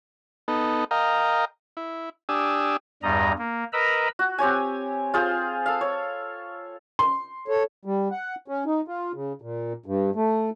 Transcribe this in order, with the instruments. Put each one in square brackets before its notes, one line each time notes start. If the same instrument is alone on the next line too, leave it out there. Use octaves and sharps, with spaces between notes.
[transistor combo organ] B3 D#4 A4
A#4 D#5 F5 G5 A#5
E4
D4 G4 G#5 D#6 E6
[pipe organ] E2 G2 G3 D#5 A#5
A#3
A#4 B4 D#5 A#5 B5 E6
[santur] F#4
C4 G4 C#5 G#5
F4 G#4 C5 F5
A4 F5
C#5
[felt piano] C6
[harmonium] A4 C#5
G3
F#5
C#4
D#4
F4
C#3
A#2
G2
A3